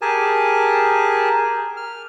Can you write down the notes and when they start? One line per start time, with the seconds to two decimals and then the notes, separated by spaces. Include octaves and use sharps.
0.02 G4 G#4 A#4 G#5 A5
1.77 F6